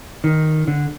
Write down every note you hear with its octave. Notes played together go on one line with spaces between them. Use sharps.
D#3
D3